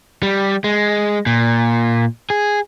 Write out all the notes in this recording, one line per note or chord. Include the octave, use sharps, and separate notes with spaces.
G3
G#3
A#2
G#4